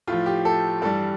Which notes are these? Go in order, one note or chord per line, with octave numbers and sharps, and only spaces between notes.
A2 F3 F4
G4
A4
G2 E3 G3 A4